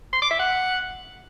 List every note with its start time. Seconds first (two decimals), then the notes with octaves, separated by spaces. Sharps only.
0.13 C6
0.22 D6
0.31 E5
0.39 F#5